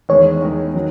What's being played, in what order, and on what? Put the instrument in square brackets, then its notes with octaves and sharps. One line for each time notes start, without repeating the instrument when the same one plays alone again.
[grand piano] E2 D#3 G#3 [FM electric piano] C#5
[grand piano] E2 D#3 G#3
D#3 F#3